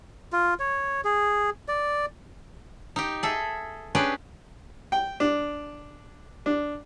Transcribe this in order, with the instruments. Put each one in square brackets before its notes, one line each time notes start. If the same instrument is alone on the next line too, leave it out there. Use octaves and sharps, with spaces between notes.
[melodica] F4
C#5
G#4
D5
[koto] D#4 G4
G#4 A4 E5
C#4 D4 G4 G#4 B4
[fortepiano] G5
D4
D4